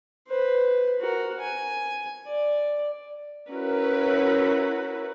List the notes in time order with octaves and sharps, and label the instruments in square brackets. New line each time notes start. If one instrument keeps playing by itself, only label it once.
[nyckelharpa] B4 C5
F#4 A#4
G#5
D5
[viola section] C#4 E4 F#4 A#4 B4